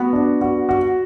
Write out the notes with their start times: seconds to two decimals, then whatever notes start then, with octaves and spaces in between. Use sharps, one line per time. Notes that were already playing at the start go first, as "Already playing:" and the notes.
Already playing: B3 F#4
0.13 D4
0.41 F#4
0.69 F#4